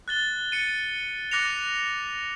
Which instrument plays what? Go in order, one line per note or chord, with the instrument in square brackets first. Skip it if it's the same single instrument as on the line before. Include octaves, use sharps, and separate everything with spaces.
[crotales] F#6 A6 G7
C#7 D#7
D6 F#6 A#6 C#7 F7